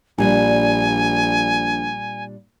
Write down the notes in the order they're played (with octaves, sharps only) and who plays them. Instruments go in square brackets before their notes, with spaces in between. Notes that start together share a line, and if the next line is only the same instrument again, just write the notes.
[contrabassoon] A#1 [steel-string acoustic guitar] A#2 G3 D4 [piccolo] G#5